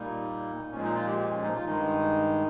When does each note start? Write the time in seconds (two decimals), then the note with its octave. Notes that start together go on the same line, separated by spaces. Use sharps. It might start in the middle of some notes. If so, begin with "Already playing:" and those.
Already playing: A#2 G3 A#3 D#4
0.71 A#2 F3 G#3 C#4
0.83 D#4
0.95 F4
1.06 G4
1.19 G4
1.31 C#4
1.43 D#4
1.54 F4
1.66 G2 D#3 G#3 D#4